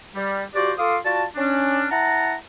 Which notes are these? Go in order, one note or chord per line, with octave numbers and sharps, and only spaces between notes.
G3
F3 F#4 G4 C5 D5
F4 A4 F5 C6 D6 D#6
F4 F#4 D5 A5
C#4 D4
E4 F#5 A5 A#5